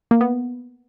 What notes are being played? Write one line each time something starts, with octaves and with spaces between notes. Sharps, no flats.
A#3
B3